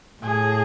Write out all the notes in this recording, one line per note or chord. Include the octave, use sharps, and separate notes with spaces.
A2 G#4